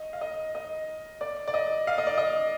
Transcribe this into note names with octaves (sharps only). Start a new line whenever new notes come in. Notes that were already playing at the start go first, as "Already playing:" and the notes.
Already playing: D#5
F5
D#5
D#5
D5
D5
D#5
F5
D#5
D5
D#5